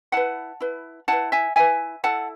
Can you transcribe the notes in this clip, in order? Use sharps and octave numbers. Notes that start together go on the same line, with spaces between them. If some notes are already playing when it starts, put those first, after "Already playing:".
E4 B4 F#5 A5
E4 B4
E4 B4 F#5 A5
E5 G#5
E4 B4 E5 G#5
E4 A4 F#5 A5